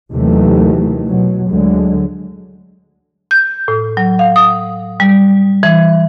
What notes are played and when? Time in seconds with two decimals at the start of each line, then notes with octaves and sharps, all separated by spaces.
0.11 D#2 C3 D#3 E3 F#3 A3
1.05 B2 F#3
1.50 D2 D3 F#3 G#3
3.31 G6
3.68 A2
3.97 F#3
4.19 F5
4.36 D#6
5.00 G3
5.63 E3